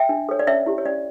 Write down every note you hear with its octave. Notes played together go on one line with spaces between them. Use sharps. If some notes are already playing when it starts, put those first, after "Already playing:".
Already playing: E5 G5
D4
A4 C#5
D5
C#4 C#5 E5
E4 G4
C#5
C#4 D5